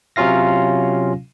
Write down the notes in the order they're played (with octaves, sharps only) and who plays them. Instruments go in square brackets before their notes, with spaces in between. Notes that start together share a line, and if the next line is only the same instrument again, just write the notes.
[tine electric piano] C3 F#3 C#4 F4 F5 A#6